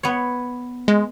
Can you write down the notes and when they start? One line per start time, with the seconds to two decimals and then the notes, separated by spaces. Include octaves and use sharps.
0.03 B3 C#5
0.88 G#3